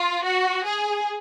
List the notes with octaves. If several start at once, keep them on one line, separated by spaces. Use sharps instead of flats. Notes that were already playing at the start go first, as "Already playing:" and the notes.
Already playing: F4
F#4
G#4